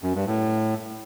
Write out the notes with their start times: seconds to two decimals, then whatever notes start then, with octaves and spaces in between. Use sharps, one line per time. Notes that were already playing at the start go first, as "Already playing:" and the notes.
0.03 F#2
0.15 G2
0.27 A2